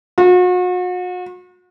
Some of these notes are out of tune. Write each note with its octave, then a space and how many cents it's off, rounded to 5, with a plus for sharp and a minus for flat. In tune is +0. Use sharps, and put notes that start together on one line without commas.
F#4 -40